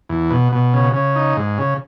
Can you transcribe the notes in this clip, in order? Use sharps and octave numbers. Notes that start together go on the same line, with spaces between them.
E2
B2
B2
C#3
C#3
D#4
G#2
C#3